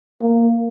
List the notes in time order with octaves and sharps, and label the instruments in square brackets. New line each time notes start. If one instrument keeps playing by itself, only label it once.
[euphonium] A#3